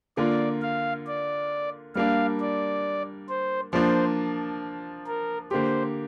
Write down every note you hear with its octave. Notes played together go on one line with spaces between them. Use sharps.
D3 A#3 F4 D5
F5
D5
G3 A#3 D4 F5
D5
C5
F3 A#3 D4 C5
A#4
D3 A#3 G4 C5